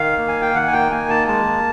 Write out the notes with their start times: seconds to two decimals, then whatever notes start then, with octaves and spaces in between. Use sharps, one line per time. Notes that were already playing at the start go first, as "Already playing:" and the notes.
Already playing: D#3 F5
0.18 A#3
0.28 G#5
0.42 G5
0.55 D#3 F#5
0.67 G#5
0.72 G5
0.91 A#3 G#5
1.10 A5
1.28 G#3 A5